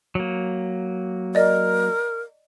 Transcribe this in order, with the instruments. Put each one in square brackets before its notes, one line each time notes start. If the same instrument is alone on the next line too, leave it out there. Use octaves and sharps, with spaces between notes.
[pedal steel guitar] F#3 A#3
[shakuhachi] A#4 [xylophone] D5 D#5